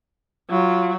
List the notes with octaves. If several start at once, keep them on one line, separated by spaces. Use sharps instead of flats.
F#3 F4